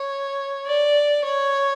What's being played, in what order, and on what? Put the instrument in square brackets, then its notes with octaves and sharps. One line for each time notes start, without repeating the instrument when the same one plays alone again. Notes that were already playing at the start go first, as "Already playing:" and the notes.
Already playing: [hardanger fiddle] C#5
D5
C#5